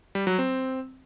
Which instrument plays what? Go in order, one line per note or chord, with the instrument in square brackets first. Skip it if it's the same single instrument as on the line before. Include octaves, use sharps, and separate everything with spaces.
[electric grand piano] G3
F#3
C4